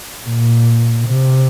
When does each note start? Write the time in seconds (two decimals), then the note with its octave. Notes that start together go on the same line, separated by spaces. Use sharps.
0.23 A#2
1.08 C3